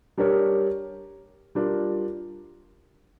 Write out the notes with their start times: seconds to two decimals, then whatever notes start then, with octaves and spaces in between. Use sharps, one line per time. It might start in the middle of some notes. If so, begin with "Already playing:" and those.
0.18 G3 D4 G4 A#4 C#5
1.55 G3 D4 F4 A#4